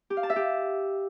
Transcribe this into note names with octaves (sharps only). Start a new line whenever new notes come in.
G4
F5
A5
E5
G4